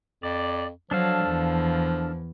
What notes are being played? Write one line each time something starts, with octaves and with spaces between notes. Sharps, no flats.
F2 D5
F3 F#3 D4 A4 F5
E2